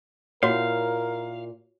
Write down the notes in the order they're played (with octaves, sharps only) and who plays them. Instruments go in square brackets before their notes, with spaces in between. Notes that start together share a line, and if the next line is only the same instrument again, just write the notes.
[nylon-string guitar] A#2 E4 F#5 [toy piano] F#4 C#5 [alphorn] A#4 [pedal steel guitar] F5